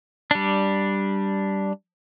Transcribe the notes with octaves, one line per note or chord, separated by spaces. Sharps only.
G3 D4